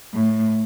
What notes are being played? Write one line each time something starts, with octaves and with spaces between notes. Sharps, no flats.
A2